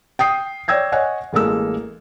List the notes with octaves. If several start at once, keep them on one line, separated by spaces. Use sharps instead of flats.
G5 D#6 C7
C#5 D5 G5 E6 G#6 A#6
C#5 D#5 F#5 G#5
A1 G#3 A#3 A4 E6